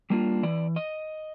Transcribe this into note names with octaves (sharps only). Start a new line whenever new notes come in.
G3 A#3 D4 F4
E3 D5
D#5